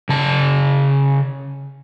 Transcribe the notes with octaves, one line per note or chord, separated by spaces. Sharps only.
C#3 A5